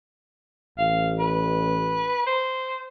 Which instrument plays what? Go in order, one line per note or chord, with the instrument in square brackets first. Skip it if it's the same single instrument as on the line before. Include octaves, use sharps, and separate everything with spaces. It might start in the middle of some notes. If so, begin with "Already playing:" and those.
[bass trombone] A1 [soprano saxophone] F5
[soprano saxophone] B4
C5